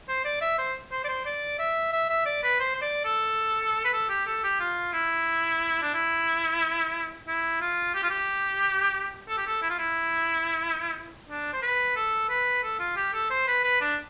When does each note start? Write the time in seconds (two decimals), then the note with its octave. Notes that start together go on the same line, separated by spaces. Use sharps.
0.09 C5
0.25 D5
0.41 E5
0.59 C5
0.92 C5
1.05 D5
1.09 C5
1.26 D5
1.59 E5
1.93 E5
2.09 E5
2.26 D5
2.43 B4
2.60 C5
2.75 C5
2.82 D5
3.05 A4
3.85 B4
3.93 A4
4.09 G4
4.27 A4
4.44 G4
4.60 F4
4.93 E4
5.83 D4
5.94 E4
7.28 E4
7.61 F4
7.95 G4
8.03 F4
8.10 G4
9.29 A4
9.38 G4
9.47 A4
9.62 E4
9.70 F4
9.79 E4
11.29 D4
11.53 C5
11.62 B4
11.96 A4
12.29 B4
12.63 A4
12.79 F4
12.96 G4
13.14 A4
13.30 C5
13.47 B4
13.64 B4
13.81 D4